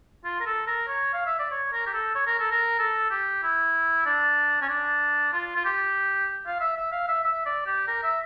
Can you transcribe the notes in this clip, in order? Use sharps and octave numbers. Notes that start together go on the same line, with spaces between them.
F4
A#4
A4
A#4
C#5
F5
E5
D5
C#5
A#4
G4
A4
C#5
A#4
A4
A#4
A4
G4
E4
D4
C#4
D4
F4
F4
G4
F5
E5
E5
F5
E5
E5
D5
G4
A#4
E5